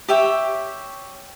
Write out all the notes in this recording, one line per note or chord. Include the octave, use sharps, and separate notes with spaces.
G4 C#5 E5 G5